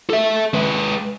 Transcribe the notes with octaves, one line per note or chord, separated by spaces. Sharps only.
A4 E5
G#3 B4